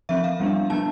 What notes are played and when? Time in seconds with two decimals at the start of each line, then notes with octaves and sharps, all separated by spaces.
0.09 F3 C4 E5
0.24 F5
0.40 G3 B3 D4
0.70 F3 B3 D4 A5